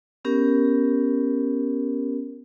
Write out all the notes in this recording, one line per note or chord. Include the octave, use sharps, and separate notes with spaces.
B3 C#4 G4 A#4